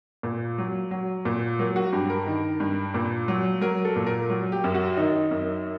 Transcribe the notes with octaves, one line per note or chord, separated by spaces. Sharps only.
A#2
F#3
F#3
A#2
F#3 A#3
F#4
G2 G4
A#4
D#3
G2
A#2
F#3
F#3 A#4
A4
A#2
A#4
F#3
G4
F#2
F#4
D#3 D#4
F#2